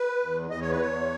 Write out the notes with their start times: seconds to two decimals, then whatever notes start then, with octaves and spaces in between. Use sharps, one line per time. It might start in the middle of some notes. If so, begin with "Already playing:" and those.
Already playing: B4
0.22 E2
0.50 E2 D#5
0.61 C#5
0.71 B4
0.79 E2 C#5